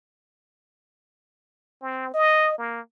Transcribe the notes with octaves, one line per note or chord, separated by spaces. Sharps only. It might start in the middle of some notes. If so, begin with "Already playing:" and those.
C4
D#5
A#3